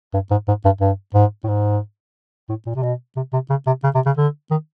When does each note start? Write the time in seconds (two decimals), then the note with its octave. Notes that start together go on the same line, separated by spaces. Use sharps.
0.14 G2
0.31 G#2
0.48 G#2
0.65 G2
0.81 G2
1.14 G#2
1.44 A2
1.48 G#2
2.49 A2
2.66 A#2
2.75 C3
2.83 B2
3.16 C3
3.33 C3
3.50 C#3
3.67 C3
3.83 C#3
3.95 C3
4.06 C#3
4.17 D3
4.51 D#3